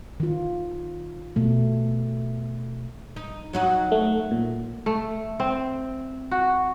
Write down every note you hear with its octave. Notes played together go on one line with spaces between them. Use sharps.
D#3 F4
B2 A3
D#4
F#3 D#4 F#4
A3
A#2
A3
C4
F#4